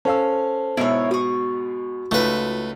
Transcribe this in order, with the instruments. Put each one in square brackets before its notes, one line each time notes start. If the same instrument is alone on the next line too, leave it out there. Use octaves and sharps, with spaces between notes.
[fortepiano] C#4 F5 E6 [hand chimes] A4 C5 A5
[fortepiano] G#2 B2 [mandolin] E4 A#4 C#5
[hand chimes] F#4 [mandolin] C#6 D#6
[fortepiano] C#2 D#4 F4 [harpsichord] A3 B4